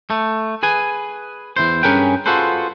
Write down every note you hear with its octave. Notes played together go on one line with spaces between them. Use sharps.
A3
G#4 B4 G#5
E2 C#3 E4 C5
G2 C#4 G#4 A#4 B4 G5
F4 F#4 G#4 A4 B4 C5